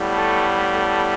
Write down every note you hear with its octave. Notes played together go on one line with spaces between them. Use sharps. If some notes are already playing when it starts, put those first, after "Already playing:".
Already playing: A2 G3 B3
A3 A4
A3 A4